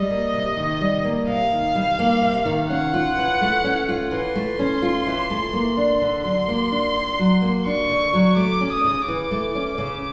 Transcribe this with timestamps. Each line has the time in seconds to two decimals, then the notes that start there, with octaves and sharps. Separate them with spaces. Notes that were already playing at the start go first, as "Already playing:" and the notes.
Already playing: G3 D#5
0.10 A#3
0.33 C3
0.57 D#3
0.81 G3
1.04 A#3
1.27 C3 F5
1.51 D#3
1.75 G3
1.99 A#3
2.22 C3
2.45 D#3
2.69 C#4 F#5
2.94 F4
3.17 E3
3.41 A3
3.64 C#4
3.88 F4
4.11 E3 C6
4.35 A3
4.59 C#4
4.82 F4
5.06 E3
5.30 A3
5.53 A#3
5.77 D4
6.01 D3
6.24 F#3 C6
6.48 A#3
6.72 D4
6.95 D3
7.19 F#3
7.42 A#3
7.66 D4 C#6
7.89 D3
8.13 F#3
8.36 A3 D6
8.61 C#4
8.73 D#6
8.85 C#3
9.08 E3 D6
9.31 A3
9.55 C#4
9.78 C#3